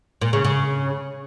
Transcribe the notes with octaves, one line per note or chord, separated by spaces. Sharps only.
A#2
C#3
C#3